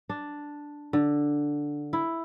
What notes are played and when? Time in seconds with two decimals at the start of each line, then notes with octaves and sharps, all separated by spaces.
0.09 D4
0.93 D3
1.93 E4